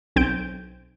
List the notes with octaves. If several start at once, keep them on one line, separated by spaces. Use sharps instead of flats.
B1 C4 G6 D7